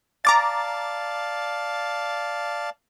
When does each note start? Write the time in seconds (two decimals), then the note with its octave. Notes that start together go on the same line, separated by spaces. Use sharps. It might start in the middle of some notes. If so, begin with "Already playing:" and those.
0.25 D5 F5 A5 A#5 D6 A6